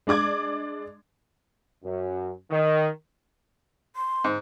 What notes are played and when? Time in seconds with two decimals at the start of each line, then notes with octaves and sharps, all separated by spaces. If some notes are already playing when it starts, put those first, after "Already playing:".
0.07 G#3 D4 D5 D6 G#6
1.84 F#2
2.51 D#3
3.96 C6
4.24 G#2